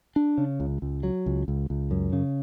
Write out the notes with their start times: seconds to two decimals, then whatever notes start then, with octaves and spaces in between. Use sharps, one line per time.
0.16 D4
0.38 C#3
0.60 C#2
0.82 C#2
1.03 F#3
1.26 C#2
1.48 C#2
1.70 C#2
1.91 F#2
2.13 C#3